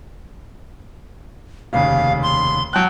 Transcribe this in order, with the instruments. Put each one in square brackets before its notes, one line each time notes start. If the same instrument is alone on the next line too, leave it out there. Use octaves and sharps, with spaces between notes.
[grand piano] F1 D#2 C#3 [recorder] F5
[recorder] C6
[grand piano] F#3 A5 F#6 [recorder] G5